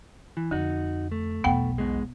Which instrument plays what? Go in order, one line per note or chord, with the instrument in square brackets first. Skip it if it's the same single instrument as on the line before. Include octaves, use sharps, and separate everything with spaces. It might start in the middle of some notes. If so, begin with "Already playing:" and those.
[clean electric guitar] E3
[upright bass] F2 [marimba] D3 [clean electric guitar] D#4 F#4
[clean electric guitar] A3
[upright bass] B1 E2 [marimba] B3 F#5 G5
[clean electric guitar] G#2 B2 G#3